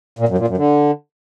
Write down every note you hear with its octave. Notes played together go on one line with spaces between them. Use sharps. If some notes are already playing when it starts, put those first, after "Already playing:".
A#2
F#2
A#2
F#2
D3